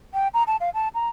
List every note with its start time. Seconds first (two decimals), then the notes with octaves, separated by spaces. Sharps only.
0.14 G5
0.34 A#5
0.47 A5
0.60 F5
0.74 A5
0.95 A#5